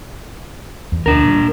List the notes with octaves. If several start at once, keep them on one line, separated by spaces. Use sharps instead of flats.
E2
D2 D4 A#4
A#2 G3